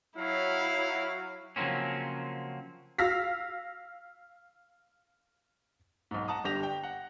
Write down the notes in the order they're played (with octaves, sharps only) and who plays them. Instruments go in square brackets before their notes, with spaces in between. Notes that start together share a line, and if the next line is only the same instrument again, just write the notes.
[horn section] F#3 [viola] E4 [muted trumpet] F5
[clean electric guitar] C#3 F3 F#3 A#3 C4 C#4
[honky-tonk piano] F5 E6 F6 A#6 B6
[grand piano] B1 G#2
F#5 A5 A#5 D#6
G1 D3 G4 A#6 F7
G5
F#5